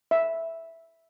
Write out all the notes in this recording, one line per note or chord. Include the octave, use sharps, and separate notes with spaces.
E5